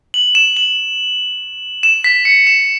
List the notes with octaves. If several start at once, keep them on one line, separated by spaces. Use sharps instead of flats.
F#7
E7
F#7
E7
B6
C#7
E7